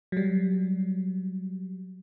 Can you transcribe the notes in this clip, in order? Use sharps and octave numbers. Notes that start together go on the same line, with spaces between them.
F#3 G3